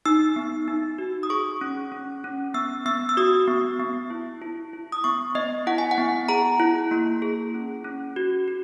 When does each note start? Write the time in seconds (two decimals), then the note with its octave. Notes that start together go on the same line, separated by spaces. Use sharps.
0.06 D#4 E6
0.36 B3
0.68 D#4
0.98 F#4
1.23 D#6
1.30 G#4 C#6
1.61 C#4
1.92 C#4
2.24 C#4
2.54 B3 E6
2.86 B3 E6
3.09 E6
3.17 F#4 D#6
3.48 B3
3.80 B3
4.10 E4
4.42 E4
4.73 E4
4.92 D#6
5.04 B3 C#6
5.35 B3 D#5
5.67 E4 F#5
5.78 G#5
5.91 F#5
5.98 B3
6.29 G#4 A#5
6.60 E4
6.91 A#3
7.22 G#4
7.54 C#4
7.84 C#4
8.16 F#4
8.48 F#4